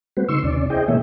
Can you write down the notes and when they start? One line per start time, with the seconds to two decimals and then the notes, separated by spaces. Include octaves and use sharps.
0.17 G3 A3 C4 F#4 B4 C5
0.28 C#3 D#4 C6 C#6 E6
0.43 D#2 C3 C#4 D5
0.70 E4 G#4 C5 D#5 G5
0.88 B2 E3 A3 A#3 C#5 E5